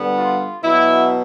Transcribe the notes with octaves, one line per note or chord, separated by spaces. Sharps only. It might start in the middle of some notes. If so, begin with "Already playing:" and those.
Already playing: D3 G3 B3
F4
B2 F#3 B3 E4